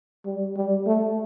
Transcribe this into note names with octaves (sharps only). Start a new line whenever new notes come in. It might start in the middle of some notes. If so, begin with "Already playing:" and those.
G3
G3
A3